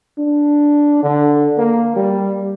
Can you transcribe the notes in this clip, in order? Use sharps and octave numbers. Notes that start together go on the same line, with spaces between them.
D4
D3
A#3
G3